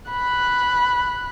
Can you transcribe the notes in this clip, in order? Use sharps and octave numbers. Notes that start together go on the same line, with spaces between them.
B5 F#6